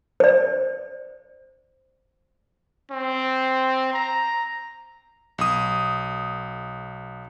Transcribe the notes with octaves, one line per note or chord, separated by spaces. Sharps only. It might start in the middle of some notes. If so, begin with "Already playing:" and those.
C5 D5
C4
A#5
B1 D#6